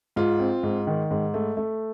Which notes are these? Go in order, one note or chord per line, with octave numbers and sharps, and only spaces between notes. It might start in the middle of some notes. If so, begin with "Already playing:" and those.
G#2 F4
C4
G#2
D#3
G#2
A3
A3